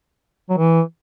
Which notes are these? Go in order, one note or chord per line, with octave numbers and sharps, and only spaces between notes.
F#3
E3